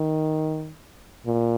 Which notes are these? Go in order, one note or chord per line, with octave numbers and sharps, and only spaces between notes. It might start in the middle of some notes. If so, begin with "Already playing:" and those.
Already playing: D#3
A#2